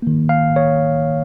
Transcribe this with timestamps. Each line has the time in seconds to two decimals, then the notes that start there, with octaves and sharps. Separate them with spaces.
0.02 D#3 A#3
0.29 F5
0.56 C#5